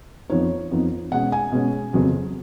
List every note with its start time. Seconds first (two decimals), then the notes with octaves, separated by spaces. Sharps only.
0.30 F2 F3 B3 D#4 C#5
0.71 F2 F3 B3 D#4
1.12 B2 G#3 C#4 F#5
1.32 G#5
1.52 B2 G#3 C#4
1.93 F2 C#3 F#3 B3